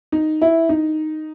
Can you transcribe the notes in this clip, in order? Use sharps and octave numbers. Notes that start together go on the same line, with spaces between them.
D#4
E4
D#4